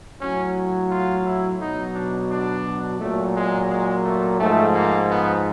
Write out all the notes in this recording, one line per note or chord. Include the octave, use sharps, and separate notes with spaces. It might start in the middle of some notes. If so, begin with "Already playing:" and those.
A2 F#3 C#4
F4
E4
B2 F#3 D#4
D4
D4
A#2 F#3 A3
G#3
G#3
A3
G#2 F3 A3
A#3
B3